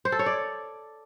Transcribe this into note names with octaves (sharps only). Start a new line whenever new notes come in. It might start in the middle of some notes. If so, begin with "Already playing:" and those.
C5
A4
C#5
D5